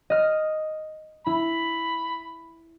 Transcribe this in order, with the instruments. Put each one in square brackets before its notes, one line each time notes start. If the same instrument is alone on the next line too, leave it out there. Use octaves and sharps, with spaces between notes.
[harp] D#5 F6
[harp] E4 [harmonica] B5